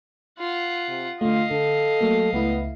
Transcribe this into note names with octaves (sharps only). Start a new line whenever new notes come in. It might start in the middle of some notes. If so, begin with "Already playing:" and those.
F4 F#5
C3
D3 A3 F4 D#5 F5
D3 A4
F#3 A3 A#3
C#2 A3 B3 E4